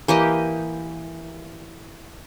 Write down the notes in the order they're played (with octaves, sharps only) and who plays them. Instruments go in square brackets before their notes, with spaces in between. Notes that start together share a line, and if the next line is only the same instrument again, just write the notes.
[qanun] E3 A#3 G4 D#5